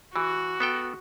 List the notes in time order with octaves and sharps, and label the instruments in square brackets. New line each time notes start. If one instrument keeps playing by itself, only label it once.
[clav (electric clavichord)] E3 [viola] F#4
[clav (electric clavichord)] B3 A4 G5